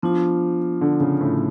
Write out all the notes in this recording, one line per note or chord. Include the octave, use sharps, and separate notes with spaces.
F3 B3 D4 F4
D3
C#3
A2